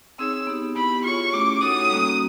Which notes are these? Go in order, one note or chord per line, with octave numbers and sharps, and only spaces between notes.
C4 D#4 G#4 C#5 E6
B3 D#4 G4
B3 E4 G4 B5
F4 G#4 C#5 C#6
A3 C#4 E4 G4 D6
D#4 F#4 A4 C#5 F#5 D#6
G3 A#3 C#4 F#4